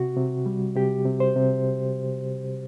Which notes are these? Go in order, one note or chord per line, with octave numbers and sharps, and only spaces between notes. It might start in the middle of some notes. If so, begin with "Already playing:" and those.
Already playing: C3 F#4
C3
G3
C3 G4
C3
C5
C3